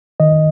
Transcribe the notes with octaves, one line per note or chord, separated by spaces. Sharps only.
D#3 D#5